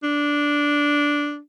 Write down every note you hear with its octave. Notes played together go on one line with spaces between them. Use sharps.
D4